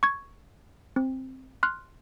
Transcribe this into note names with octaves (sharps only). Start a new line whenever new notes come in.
C#6 G#6
C4
C6 F6 F#6